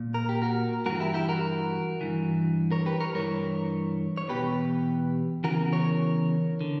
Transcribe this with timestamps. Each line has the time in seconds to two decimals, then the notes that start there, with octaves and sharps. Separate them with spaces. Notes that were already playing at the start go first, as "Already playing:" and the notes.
Already playing: A#2
0.14 A#4
0.29 G4
0.42 F#4 A#4
0.86 G2 E3 F#4 A#4
1.00 E4 G4
1.14 E4 G4
1.28 F#4 A#4
2.01 G2 E3
2.71 A#4 C#5
2.86 G4 B4
3.00 A#4 C#5
3.14 G2 E3 A#4 C#5
4.17 C#5
4.29 E2 B2 G4 B4
5.44 E2 C#3 E3 F#4 A#4
5.73 A#4 C#5
6.61 D3